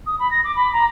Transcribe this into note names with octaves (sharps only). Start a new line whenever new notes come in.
D#6
B5
A#6
D6
B5
A#5